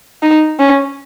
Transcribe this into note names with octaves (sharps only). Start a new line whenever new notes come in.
D#4
C#4